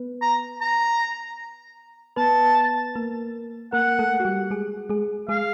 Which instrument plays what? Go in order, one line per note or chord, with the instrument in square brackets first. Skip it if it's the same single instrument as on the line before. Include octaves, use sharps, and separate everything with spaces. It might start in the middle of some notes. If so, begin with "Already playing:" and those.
Already playing: [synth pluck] B3 B4
[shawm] A#5
A#5
[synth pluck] B3 B4 [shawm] A5
[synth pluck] A#3 A#4
[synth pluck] A#3 A#4 [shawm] F#5
[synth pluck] A3 A4
F#4
G3 G4
G#3 G#4
G#3 G#4
[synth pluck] G#3 G#4 [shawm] F5